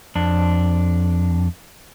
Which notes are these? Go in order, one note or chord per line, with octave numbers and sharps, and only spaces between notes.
F2 D4